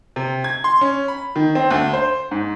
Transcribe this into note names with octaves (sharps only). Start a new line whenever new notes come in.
C3
G#6
C6
C#4
B5
D#3
C4
D2
C5
G#2